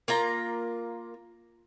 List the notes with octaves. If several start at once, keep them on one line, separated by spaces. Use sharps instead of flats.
A#3 F4 A#5